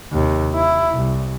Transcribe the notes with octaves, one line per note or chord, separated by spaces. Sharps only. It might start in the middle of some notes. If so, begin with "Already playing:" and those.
D#2 C3
E4
C2